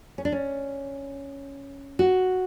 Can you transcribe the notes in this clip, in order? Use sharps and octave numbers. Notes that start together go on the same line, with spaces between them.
C#4
D4
C#4
F#4